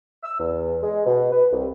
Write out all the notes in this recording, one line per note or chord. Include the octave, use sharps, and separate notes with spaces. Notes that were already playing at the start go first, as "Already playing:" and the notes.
E6
E2
G#3
B2
B4
C2